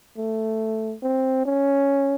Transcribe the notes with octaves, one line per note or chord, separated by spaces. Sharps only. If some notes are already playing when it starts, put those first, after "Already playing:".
A3
C4
C#4